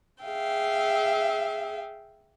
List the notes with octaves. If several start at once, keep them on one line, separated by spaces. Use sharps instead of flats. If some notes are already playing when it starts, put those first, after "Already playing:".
G#4 E5 F5 G5